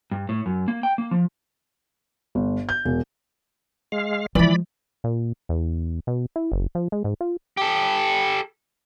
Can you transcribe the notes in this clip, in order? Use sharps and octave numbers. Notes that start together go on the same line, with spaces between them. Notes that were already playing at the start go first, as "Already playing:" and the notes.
G2
A2
F#2
A#3
G5
A#3
F3
G1
G6
E1
G#3 F5
E3 F3 G#3 D5 B5
A#2
E2
B2
E4
F#1
F3
G#3
G#2
F4
G4 A4